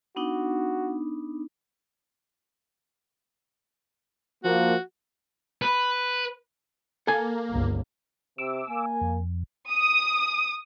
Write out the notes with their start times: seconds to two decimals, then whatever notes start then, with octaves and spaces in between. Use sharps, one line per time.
0.16 B3 D4 D#4 F#4
4.44 F3 A#3 F#4
5.62 B4
7.07 A#3 A4 G#5
7.51 G1 C#2
8.38 C3 D6 E6
8.69 A#3 G#5
9.01 F2
9.71 D#6